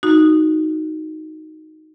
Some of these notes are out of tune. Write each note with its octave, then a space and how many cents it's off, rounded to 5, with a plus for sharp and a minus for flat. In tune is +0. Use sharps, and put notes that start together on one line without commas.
D#4 +5 F#4 +0